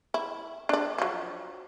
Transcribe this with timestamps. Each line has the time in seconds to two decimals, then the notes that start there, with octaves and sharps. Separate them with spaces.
0.14 E4
0.69 D4 D5
0.98 F3 F#3